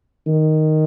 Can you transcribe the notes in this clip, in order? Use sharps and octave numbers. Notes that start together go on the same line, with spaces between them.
D#3